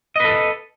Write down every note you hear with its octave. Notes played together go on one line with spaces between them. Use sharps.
A4 B4 D#5